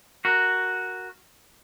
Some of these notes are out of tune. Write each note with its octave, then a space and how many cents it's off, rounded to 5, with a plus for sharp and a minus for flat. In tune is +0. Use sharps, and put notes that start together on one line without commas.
F#4 +0 A#4 +0